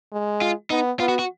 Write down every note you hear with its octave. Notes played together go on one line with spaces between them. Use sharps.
G#3
F4
B3 D#4
B3 F4
F#4
F#4